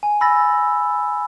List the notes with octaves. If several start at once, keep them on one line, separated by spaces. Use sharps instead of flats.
G#5
B5 E6 A6 A#6